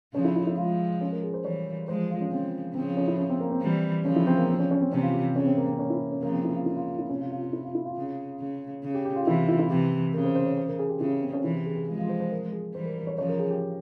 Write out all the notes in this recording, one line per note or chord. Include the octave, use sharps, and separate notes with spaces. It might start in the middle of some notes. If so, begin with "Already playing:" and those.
C#3 F3 C#4
E4
E4
E4
F3 G#3 F4
C#4
A#4
G#4
C5
E3 G3 C#5
F3 G#3 C5
F4
C#4
C#3 F3 C4
C#3 F3 C4
C#4
E4
C#4
C4
A#3
C4
E3 G3
C#3 F3 C#4
E4
C4
A#3
C4
C#4
C#4
C4
C3 E3 C#4
F4
G4
C#3 C#4
C4
A#3
C4
C#4
E4
C#4
C#3 F3 A#3
C4
E4
F4
C#3 E4
F4
F4
E4
C3 C#4
F4
F4
F4
E4
F4
E4
F4
C#3
C#3
C#3
G4
G4
F4
C3 E3 E4
E4
E4
C3 E3 G4
C#3 A#4
C5
C5
C#5
C5
A#4
G#4
G4
C#3 E4
C4
C#4
C3 E3 E4
G4
G#4
G#4
F3 G#3 F4
F4
C5
C5
A#4
G#4
E3 G3 C5
A#4
A#4
C#5
C#3 F3 C#5
A#4
G#4
G4